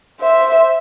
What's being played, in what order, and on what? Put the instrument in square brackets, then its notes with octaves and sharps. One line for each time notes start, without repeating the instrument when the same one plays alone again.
[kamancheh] C5 E5